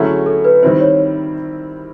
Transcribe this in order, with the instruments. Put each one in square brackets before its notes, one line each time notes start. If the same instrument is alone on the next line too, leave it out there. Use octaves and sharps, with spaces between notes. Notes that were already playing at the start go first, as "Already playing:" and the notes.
Already playing: [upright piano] D3 F#3 A3 C#4 E4 [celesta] G#4
[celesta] A4
B4
[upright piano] D#3 G3 C4 E4 [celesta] C5
[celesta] C#5